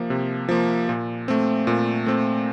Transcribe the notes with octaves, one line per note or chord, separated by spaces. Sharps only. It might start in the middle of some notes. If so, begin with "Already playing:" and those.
Already playing: C3 F3 A#3
C3
F3 A#3
A#2
A3 C4
A#2
A3 C4